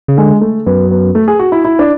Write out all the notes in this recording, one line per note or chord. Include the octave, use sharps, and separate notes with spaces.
C#3
D3 G#3
A3
F#2 B3
B3
A3
G#4
F#4
E4
E4
D4